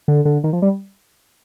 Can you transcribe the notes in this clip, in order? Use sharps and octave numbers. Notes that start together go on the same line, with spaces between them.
D3
D3
D#3
F3
G3